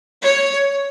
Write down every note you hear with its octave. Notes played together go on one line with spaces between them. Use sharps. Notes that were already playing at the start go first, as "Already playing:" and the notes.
C#5